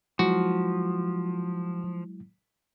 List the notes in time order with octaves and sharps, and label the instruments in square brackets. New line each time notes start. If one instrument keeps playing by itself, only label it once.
[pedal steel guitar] F3 [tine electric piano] F#3 G#3 E4 [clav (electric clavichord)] F#4